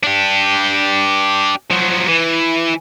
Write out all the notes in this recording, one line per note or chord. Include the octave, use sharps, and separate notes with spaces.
D4 G4
F3 F#3
E3